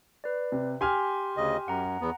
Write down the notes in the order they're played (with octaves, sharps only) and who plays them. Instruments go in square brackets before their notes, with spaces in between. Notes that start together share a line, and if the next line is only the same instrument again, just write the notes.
[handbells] B4 D5
[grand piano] C3
[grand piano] G4 G#5 F6 [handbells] C6
[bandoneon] D2 C#3 D#5
[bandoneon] F#2 [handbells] F#5 A#5
[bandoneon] E2 B3